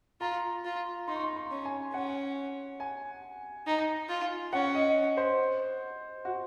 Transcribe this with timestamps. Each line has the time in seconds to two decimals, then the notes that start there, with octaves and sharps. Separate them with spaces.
0.21 F4 A#5
0.65 F4
1.08 D#4 C6
1.15 C#6
1.23 C6
1.36 C6
1.51 C#4
1.65 G#5
1.93 C#4 F#5
2.80 G#5
3.66 D#4
4.09 F4
4.53 C#4 F#5
4.75 D#5
5.17 C5
6.25 F#4